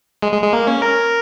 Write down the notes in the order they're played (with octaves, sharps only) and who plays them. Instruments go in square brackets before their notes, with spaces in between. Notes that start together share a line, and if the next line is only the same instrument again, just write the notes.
[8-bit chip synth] G#3
G#3
G#3
A#3
C#4
A#4